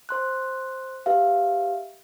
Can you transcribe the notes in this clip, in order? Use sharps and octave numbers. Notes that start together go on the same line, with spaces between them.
C5 C6 F#6
G4 B4 E5 F5